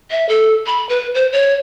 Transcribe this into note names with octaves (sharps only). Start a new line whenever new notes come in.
E5
A4
B5
B4
C5
C#5